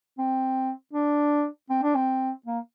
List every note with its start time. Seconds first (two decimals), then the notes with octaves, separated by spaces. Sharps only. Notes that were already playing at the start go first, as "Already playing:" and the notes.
0.18 C4
0.93 D4
1.70 C4
1.83 D4
1.95 C4
2.46 A#3